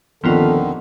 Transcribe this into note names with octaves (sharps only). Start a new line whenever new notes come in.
D#1 D3 D#3 F3 B3 C4 F4 A4